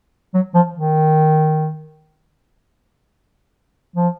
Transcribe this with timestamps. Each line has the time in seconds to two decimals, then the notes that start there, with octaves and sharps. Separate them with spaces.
0.34 F#3
0.54 F3
0.75 D#3
3.96 F3